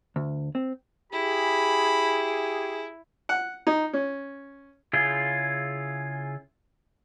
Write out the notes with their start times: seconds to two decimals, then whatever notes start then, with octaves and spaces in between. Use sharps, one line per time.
0.16 D2
0.55 C4
1.13 E4 G4 G#4 B5
3.29 F#5
3.67 D#4
3.93 C#4
4.93 C#3 E4 F4 G#4